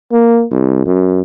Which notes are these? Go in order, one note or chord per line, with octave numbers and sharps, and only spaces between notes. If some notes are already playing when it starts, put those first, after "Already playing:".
A#3
C2
F#2